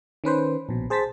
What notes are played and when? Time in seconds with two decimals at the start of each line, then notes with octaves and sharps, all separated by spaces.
0.24 D#3 C#4 B4 C5
0.69 A#1 B2
0.90 G#4 C5 A5 A6 B6